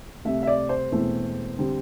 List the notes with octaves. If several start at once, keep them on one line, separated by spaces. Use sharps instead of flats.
C2 C3 A3 E5
E5
D5
C5
E1 E2 E3 A3 C4
D3 G3 C4